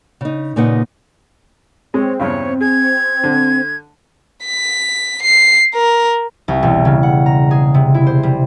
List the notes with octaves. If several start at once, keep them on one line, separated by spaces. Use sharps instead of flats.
C#3 D#4
A#2 C#3 A#3 D#4 B4 F#5
G#3 C4 C#5
E2 G2 C#3 C#5
G#4 G#6
D3
B6
C7
A#4
C2
E1
C#3
F#5
A#5
G#4
C3
E4
C5
G3